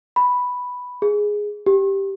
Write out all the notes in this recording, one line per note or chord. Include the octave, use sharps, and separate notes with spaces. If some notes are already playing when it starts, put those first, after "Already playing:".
B5
G#4
G4